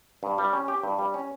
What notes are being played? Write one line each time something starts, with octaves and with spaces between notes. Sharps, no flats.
G2
G3
C#4
G4
G2
G3
C#4